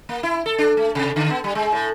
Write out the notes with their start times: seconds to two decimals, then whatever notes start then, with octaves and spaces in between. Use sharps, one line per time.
0.09 A#3
0.23 E4
0.46 A4
0.58 D4
0.77 A3
0.95 C3
1.16 D3
1.30 B3
1.44 G3
1.55 G#3
1.72 A2